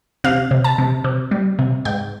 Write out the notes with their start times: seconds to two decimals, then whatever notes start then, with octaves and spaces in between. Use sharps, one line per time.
0.24 C3 F5
0.51 C3
0.64 A5
0.78 C3
1.04 C3
1.31 G3
1.59 C3
1.85 G#2 G5